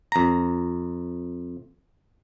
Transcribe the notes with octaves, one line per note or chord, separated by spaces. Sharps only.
F2 A#5